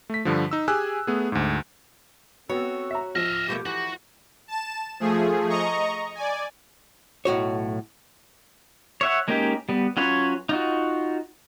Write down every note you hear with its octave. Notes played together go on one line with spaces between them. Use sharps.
A3 B6
G2 D3 F3
D#4 E6
G4 G#4 G#5 E6 F#6
A3 B3 G#4
D2 G#2
B3 C4 F#4 A4 C#5
E5 A#5
F3 D#5 E5 F6
B2 A3 A#3 G4
E3 F#4
A5 E7
F3 A3 G#4
D#5 A#5 C#6
D5 G#5
B1 A2 F#4 C#5
C#5 E5 F#5
G#3 A#3 C#4 D#4 G4
G3 B3
F#3 C#4 F4 B4 C#5
D#4 F4 F#4